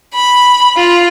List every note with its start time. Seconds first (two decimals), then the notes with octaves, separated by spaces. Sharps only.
0.14 B5
0.77 F4